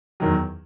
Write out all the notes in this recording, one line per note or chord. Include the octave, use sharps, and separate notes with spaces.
E2 D#3 F#3